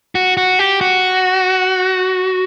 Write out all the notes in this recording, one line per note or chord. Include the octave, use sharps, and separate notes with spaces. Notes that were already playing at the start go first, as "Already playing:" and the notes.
F#4
F#4
G4
F#4